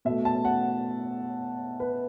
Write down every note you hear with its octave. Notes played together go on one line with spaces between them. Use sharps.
B2 A3 E5
A5
F#5
B4